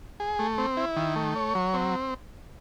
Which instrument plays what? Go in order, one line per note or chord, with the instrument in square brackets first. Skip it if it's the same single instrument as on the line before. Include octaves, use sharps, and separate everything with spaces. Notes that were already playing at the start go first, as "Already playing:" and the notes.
[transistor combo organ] G#4
A3
C4
E4
D#3
A3
C#5
F#3
C4